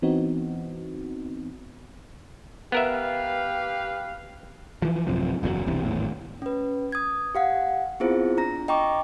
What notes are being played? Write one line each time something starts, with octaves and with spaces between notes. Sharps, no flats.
E3 B3 C4 D#4 F#4
B3 G4 A#4 B4 E5 F5
E3 F3
A1 F#2 C3 F3
F#1 E2 G#2 F#3
E1 C2 C3 E3
G#1 E2 A2
C#4 B4
D#6 G#6
G4 F5 F#5
B3 C4 E4 F4 G#4 C5
D4 A#5 A#6
D#5 G5 A#5 C#6 D6